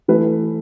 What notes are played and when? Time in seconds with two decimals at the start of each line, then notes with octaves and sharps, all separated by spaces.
0.08 E3 A3 B4